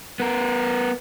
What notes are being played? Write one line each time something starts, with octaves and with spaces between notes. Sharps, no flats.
B3 A#4